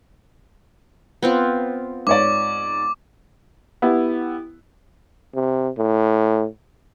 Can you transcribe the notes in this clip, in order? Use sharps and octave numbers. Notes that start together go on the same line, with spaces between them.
B3 C4 F4
G#2 C#5 D5 D6
B3 E4 G4
C3
A2